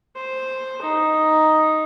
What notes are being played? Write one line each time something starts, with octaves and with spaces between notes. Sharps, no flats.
C5
D#4